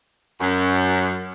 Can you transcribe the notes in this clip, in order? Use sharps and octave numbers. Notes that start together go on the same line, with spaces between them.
F#2